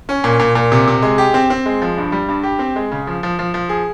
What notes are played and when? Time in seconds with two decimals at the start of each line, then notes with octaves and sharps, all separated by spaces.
0.09 C#4
0.24 A#2
0.39 A#2
0.55 A#2
0.72 C3
0.88 C3
1.02 G#3
1.18 G4
1.34 C4
1.50 C4
1.66 G#3
1.82 F3
1.97 G2
2.12 G3
2.29 G2
2.43 G4
2.59 C4
2.76 G#3
2.92 C#3
3.07 F3
3.23 F3
3.39 F3
3.54 F3
3.69 G#4